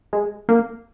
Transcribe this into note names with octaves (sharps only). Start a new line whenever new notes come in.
G#3
A#3